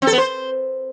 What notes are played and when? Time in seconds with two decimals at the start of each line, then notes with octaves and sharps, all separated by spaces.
0.02 C4
0.07 A4
0.12 B3
0.18 C5